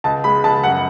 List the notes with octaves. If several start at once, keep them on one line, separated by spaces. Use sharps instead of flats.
C#2 A5
G#3 B5
C#2 A5
F#2 F#5